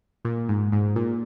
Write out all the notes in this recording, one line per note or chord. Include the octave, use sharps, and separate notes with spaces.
A#2
G#2
G#2
A#2